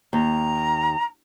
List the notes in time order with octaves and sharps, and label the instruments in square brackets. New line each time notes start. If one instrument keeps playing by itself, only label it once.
[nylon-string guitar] D#2 [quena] A#5